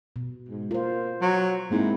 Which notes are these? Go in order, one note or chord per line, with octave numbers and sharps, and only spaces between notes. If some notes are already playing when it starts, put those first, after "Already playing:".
B2
G#2
A#3 F4 C5
F#3
G#2 A#3 C4 E4